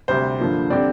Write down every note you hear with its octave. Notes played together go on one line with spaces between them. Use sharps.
D2 C3 G3 C5
G2 D3 F3 A#3
D3 G3 C4 D5